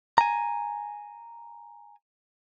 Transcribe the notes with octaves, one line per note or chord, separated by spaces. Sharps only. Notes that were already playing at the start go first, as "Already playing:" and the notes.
G#5 A#5